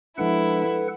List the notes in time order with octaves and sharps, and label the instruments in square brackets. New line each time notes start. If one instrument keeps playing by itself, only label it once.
[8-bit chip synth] F3 G#3 D4 [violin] E4 [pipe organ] A4 B4 F#5